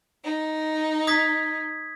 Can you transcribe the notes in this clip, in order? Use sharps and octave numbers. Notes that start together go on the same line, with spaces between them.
D#4
D#6 G#6 B6